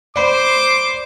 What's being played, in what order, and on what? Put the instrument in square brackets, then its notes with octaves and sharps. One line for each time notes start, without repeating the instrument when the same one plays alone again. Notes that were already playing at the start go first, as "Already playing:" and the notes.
[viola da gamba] C5 [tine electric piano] D5 B5 [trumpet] D6